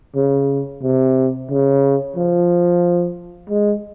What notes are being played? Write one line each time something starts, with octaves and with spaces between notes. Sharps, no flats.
C#3
C3
C#3
F3
G#3